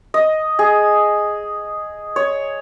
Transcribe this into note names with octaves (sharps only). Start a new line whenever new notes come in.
D#5
G#4
C#5